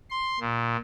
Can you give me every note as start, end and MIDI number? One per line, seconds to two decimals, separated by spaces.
0.10 0.39 84
0.40 0.77 46